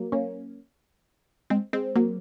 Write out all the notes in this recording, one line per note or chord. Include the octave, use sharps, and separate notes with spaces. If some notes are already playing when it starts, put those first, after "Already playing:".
Already playing: F#3 A#3
A#3 C#4
G#3 C4
G#3 C4
F#3 A#3